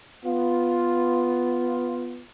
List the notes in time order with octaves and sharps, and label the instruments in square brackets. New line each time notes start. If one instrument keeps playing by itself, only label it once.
[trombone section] B3 F4